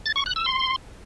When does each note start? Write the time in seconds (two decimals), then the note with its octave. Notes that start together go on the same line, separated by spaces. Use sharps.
0.06 A6
0.16 C#6
0.26 F#6
0.36 E6
0.46 C6